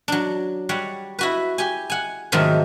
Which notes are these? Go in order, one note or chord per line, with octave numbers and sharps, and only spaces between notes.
F#3 D4
G3 C#5 F#5
E4 F#4 B4
G4 G#5
F#5 G#5
G#2 C3 D#3 F3 F#3 A3